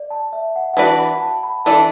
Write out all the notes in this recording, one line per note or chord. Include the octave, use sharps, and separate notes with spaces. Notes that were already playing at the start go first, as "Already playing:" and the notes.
Already playing: D5
A5
E5
F#5
F#5
E3 D4 F#4 B4 D5 A5
B5
A5
B5
E3 D4 A4 D5 A5